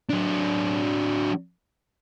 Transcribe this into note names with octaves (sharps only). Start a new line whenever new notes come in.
F#3 D4